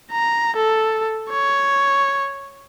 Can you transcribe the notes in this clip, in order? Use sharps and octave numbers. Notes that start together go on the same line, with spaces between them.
A#5
A4
C#5